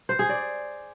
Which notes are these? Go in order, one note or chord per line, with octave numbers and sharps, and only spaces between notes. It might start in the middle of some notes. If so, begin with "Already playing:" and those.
C5
G#4
D5